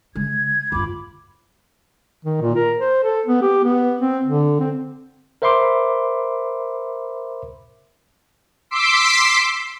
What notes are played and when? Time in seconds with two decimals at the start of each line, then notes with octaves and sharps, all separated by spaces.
0.15 C#3 G#3 G#6
0.72 G1 E2 F4 B5 D6
2.25 D#3
2.41 A#2
2.55 A#4
2.78 C5
3.04 A4
3.26 B3
3.42 G4
3.64 B3
4.01 C4
4.24 D3
4.60 C4
5.42 A#4 C5 E5 B5 C6 D6
8.71 C6 D6 E6 B6 C7 D7